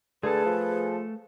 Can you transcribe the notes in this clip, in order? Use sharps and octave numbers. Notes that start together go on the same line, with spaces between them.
D3 A3 G#4 A4 B4 A5
F3